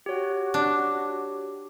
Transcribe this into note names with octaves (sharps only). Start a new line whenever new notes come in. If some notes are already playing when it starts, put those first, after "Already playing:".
F#4 G4 C#5
D4